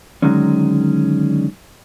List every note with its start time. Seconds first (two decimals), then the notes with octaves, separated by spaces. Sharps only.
0.22 D3 D#3 F#3 G#3 C#4